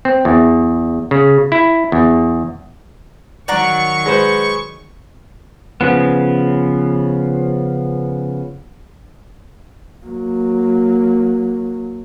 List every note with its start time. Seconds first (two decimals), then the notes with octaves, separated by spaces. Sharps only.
0.05 C4
0.25 E2
1.11 C#3
1.52 E4
1.92 E2
3.48 D#3 F#3 D5 F#5 A#5 C#6
4.06 G#3 B4 C5
5.81 C#3 F3 B3
10.04 F#3 A#3